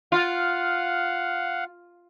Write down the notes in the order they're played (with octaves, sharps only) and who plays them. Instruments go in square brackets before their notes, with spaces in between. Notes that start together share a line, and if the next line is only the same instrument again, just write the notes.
[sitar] F4 [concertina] F5 F#5